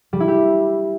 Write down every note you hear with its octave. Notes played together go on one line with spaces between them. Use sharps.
G3
E4
G4